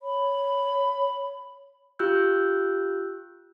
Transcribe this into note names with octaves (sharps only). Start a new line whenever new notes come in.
C#5 B5
F4 G4 E6 F#6 G6